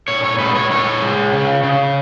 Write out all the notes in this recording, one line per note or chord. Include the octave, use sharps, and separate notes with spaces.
A#2 C#5
C#5
G#3 B4
C#5
A#2 C#5
G#3
C#3
C#3